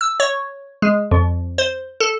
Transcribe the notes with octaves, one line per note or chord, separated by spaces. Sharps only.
E6
C#5
G#3
F2
C5
A4